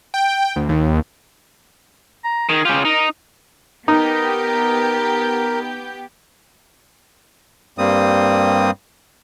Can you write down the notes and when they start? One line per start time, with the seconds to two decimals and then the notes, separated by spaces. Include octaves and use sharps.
0.14 G5
0.56 D2
0.69 D#2
2.24 A#5
2.49 D#3 G#4
2.65 C#3 F4 G4
2.85 D#4 A#4
3.88 B3 D#4 G4 A#4 G6
7.78 G2 G3 A#3 C4 D#6